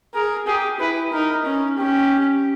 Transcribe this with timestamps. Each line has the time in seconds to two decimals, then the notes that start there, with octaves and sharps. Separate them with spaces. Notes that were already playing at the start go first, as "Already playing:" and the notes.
0.14 G#4 A#4
0.47 G4 G#4
0.80 E4 B4
1.12 D#4 A#4
1.45 C#4
1.78 C#4 G4